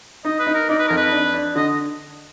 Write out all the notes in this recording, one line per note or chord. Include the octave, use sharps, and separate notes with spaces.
D#4 D#5
B4
D#4
A#4
D#4 D5
B4
F2 A#4
B4
D4
D4
D3 D#5